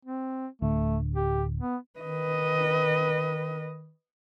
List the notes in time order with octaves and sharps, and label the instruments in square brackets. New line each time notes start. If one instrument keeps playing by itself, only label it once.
[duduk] C4
[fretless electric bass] D1 D3 [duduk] A3
[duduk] G4
B3
[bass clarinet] D#3 [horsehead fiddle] B4 D#5